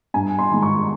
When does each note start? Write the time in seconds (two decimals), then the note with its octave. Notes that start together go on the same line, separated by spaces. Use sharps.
0.14 G2 G#5
0.39 C6
0.51 D#3 G#3
0.63 C#6